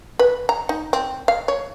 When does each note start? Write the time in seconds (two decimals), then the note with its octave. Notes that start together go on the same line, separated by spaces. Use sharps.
0.19 B4
0.49 A#5
0.69 D#4
0.93 C4
1.28 F5
1.48 C#5